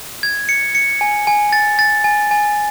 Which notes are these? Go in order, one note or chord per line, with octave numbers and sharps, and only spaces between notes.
G#6
C#7
C#7
G#5
G#5
A6
A6
G#5
G#5